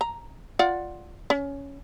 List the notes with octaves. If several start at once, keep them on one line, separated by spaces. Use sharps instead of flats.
A#5
F4 D5 F#5
C#4